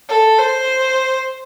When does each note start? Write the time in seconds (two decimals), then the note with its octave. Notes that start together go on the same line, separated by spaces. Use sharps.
0.09 A4
0.38 C5